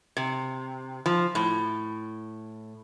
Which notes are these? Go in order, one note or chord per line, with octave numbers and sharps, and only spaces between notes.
C3
F3
A2